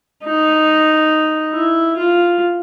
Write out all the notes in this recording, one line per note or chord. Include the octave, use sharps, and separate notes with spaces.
D#4
E4
F4